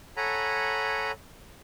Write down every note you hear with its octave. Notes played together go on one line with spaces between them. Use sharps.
A4 C#5 F#5 G#5 A#5 B5